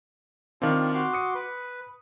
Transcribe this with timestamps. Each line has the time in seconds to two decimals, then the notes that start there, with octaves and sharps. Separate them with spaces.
0.62 D#3 C4 D4 F4
0.94 F#4 C6 D6
1.13 D#6 C#7
1.35 B4